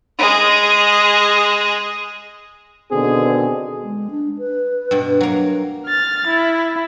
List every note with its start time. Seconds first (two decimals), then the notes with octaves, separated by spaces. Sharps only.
0.19 G#3 G#4
2.92 B2 D3 D#3 C4 G#4
3.82 G#3
4.11 D4
4.38 B4
4.91 G2 B2
5.21 F#3 A#3
5.86 F6 A6
6.27 E4